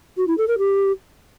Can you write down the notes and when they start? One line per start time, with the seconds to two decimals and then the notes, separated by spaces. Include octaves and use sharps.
0.17 F#4
0.27 E4
0.37 A4
0.47 A#4
0.58 G4